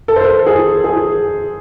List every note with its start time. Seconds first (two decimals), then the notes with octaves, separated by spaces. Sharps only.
0.08 A4
0.16 C5
0.24 A4
0.47 G#4
0.84 G#4